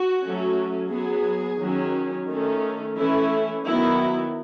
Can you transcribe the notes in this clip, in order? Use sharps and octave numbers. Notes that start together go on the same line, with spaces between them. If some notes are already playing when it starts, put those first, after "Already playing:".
Already playing: F#4
F#3 A3 C#4
F#3 B3 G#4
D#3 F#3 C#4
D#3 A3 C#4
E3 A3 C#4 E4
D#3 F#3 B3 E4